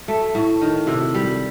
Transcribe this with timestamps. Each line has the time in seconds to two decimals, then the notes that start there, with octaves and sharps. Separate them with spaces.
0.08 A3
0.35 A2
0.61 D#3
0.87 C3
1.14 G3